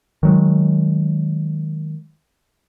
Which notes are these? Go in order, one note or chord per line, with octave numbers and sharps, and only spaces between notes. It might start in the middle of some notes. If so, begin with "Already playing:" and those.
D#3 F#3 G#3